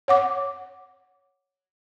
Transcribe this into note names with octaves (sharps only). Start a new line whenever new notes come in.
C#5 F#5 D6